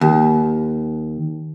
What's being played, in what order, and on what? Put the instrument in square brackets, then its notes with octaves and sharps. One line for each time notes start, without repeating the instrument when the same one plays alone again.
[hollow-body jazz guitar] D#2